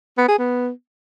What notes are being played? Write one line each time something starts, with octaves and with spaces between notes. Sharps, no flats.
B3
G#4
B3